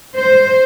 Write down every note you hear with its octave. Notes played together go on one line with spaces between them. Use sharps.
C5